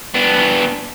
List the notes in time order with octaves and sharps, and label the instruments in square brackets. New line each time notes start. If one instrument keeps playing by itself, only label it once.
[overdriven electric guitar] B3 D4